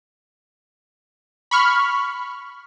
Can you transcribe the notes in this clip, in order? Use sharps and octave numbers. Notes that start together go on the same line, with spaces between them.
B5 C#6 F6